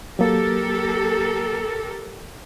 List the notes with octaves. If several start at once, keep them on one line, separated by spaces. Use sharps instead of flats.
F#3 A#3 G4 A4 A#4